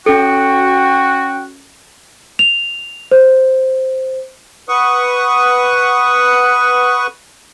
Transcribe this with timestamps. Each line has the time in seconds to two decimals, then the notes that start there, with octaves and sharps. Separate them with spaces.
0.06 C#4 F#4 A4 G5 C#7
2.39 F7
3.11 C5
4.69 B4 F#5 C#6 D#6